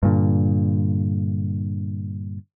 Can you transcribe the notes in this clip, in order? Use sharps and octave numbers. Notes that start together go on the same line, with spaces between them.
G2 A#2 D3